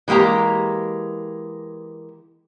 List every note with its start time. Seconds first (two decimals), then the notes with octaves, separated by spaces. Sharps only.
0.08 E3 G#3 A#3 G4 A#5